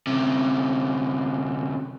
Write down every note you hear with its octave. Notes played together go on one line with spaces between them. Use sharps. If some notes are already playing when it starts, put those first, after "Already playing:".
D2 C3